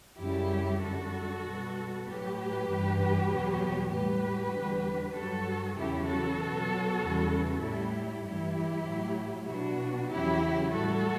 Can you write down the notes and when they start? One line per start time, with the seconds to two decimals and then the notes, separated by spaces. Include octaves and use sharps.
0.21 F#2 C#3 G3 E4 G4
0.83 F#2 D3 G3 F#4 A4
1.45 B2 G3
2.07 A2 F#3 G4 B4
2.68 G2 E3 G3
3.31 E2 B2 F#3
3.93 A2 G3 G4 B4
4.55 E2 D3 G3
5.16 G2 F#3 F#4 A4
5.78 E2 C#3 F#3 E4 G4
6.09 F#4 A4
6.39 B2 F#3
7.02 E2 C#3 G3
7.63 A2 G3 E4 G4
8.25 G2 E3 G3 E4 G4
8.87 A2 F#3
9.49 B2 F#3 D4 F#4
10.11 E2 C#3 F#3 E4 G4
10.73 A2 G3 F#4 A4